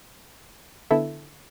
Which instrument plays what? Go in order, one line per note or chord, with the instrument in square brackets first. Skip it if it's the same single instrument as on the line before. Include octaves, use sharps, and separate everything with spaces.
[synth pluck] D3 B3 E4 A4 E5